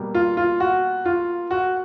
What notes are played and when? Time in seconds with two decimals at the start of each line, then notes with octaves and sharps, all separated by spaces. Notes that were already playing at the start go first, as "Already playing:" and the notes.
Already playing: B2 G3 A#3
0.15 F4
0.37 F4
0.60 F#4
1.06 F4
1.51 F#4